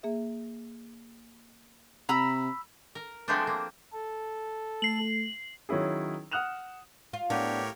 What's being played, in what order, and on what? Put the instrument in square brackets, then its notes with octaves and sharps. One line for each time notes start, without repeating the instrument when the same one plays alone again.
[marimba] A#3 G#4 E5
[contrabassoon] C3 [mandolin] A#5 B5 E6
[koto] A#4
F3 G#3 A3 B3 C4 D4
A#3
[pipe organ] A4
[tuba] A3 [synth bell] C7 F#7
[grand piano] D#3 F#3 C#4 E4 G#4
F#5 D#6 F6 F#6 E7 F7
[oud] F4
[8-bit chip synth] A2 A#4 C#5 [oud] B3 [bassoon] D4 [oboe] G4